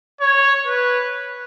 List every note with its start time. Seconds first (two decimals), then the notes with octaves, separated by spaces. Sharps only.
0.21 C#5
0.67 B4